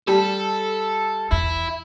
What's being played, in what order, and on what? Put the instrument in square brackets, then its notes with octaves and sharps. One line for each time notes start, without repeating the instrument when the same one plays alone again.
[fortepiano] G3 [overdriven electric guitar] A4 A5
[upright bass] E2 [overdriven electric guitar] E4